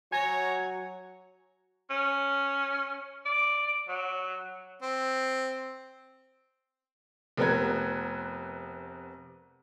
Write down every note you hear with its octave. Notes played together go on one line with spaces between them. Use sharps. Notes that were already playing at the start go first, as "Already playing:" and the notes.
F#3 F#4 C#5 G#5 A#5 G#6
C#4
D5
F#3
C4
F1 C3 B3 A#4 B4 G#6